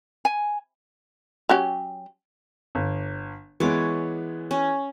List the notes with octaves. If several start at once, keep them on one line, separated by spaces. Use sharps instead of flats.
G#5
F#3 C#4 G4
G1
E3 G#3 B3 C#5 D6
C#4